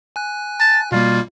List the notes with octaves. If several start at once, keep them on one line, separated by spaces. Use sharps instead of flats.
G#5 F#6
A5
B2 G3 A#3 F4